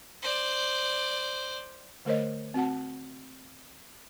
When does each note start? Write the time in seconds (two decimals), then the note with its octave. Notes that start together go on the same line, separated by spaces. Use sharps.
0.22 C5 D5
2.05 D3 A3 A#4 C5 C#5 D#5
2.54 C4 F#4 F#5 A5